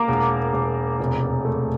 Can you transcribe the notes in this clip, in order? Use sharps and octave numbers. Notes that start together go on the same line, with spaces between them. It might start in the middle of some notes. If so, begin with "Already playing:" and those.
Already playing: A#3 A#5 D6
E1
E1
F1
A3